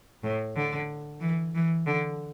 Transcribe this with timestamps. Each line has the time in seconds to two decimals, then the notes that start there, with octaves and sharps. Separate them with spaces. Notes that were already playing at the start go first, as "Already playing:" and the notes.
0.23 A2
0.56 D3
1.21 E3
1.55 E3
1.87 D3